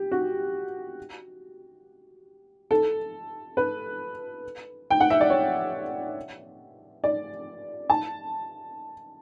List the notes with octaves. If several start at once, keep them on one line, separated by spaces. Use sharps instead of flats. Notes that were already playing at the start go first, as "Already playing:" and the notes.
Already playing: G4
F#4
A4
B4
G5
F#5
E5
D5
C#5
D5
A5